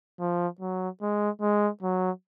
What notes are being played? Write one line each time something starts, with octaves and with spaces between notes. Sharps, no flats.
F3
F#3
G#3
G#3
F#3